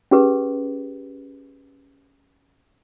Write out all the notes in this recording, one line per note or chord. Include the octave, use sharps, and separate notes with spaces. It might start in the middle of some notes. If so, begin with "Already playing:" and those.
C#4 G4 G#4 B4